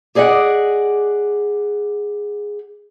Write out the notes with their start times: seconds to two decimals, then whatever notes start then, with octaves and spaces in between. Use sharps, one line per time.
0.15 G4 G#4 D5 D#5 F#5